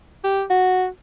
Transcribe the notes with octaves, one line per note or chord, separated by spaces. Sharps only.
G4
F#4